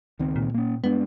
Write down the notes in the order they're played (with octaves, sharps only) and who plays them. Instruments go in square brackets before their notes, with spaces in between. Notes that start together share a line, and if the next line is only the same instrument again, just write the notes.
[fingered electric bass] C#2 D#3 C4
[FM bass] A#2
[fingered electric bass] A#3 C#4
[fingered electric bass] G2 G#3 D4 [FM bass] B3